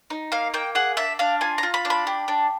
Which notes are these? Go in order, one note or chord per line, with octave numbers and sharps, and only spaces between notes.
D#4
A#3 F5
A#3 G5
G#4 F#5
D4 E5
D4 F5
F4 G#5
A#5
F4
B5
D4
B5
G4
D4